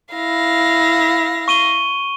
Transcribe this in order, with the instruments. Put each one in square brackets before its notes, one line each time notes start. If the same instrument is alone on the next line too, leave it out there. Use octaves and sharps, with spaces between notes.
[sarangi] E4 [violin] F5 A#6
[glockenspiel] C#6 D#7 G7